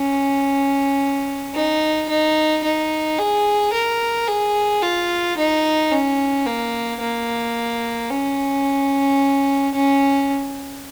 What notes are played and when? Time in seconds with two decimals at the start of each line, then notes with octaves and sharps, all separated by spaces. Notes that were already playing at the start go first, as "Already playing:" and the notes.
Already playing: C#4
1.54 D#4
2.09 D#4
2.63 D#4
3.18 G#4
3.73 A#4
4.27 G#4
4.82 F4
5.37 D#4
5.92 C#4
6.46 A#3
7.00 A#3
8.10 C#4
9.74 C#4